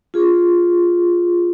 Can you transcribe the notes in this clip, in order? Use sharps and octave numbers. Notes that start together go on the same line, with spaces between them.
F4 G#4